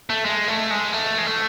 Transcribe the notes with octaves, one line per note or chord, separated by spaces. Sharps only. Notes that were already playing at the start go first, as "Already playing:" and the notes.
A3
G#3
A3
G#3
A3
G#3
A3